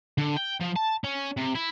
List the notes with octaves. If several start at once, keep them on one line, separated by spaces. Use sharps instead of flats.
D3
G5
F3
A5
C#4
C3
E4